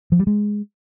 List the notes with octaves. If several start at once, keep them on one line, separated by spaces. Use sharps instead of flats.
F3
G3
G#3